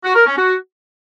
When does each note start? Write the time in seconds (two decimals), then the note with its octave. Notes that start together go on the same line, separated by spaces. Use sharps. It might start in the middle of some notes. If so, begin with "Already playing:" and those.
0.04 F#4
0.15 A#4
0.27 C#4
0.38 F#4